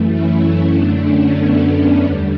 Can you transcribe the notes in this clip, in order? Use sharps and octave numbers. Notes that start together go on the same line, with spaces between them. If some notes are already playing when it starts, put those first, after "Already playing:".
Already playing: F#2 E3 A3
C#4 E4
C#4 E4
F#2 D3 A3 B3 D4
C#4
B3
E2 D3 G3